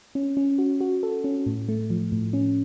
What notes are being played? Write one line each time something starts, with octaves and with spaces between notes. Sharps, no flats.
C#4
C#4
F#4
F#4
A4
C#4
A2
A3
F3
A2
C#4